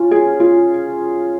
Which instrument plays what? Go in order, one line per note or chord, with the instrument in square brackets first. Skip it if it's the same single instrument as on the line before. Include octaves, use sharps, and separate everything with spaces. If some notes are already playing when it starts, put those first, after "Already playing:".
Already playing: [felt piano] C#4 F4
G#4
F4